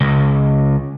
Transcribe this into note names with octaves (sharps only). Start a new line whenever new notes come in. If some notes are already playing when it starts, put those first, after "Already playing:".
C#2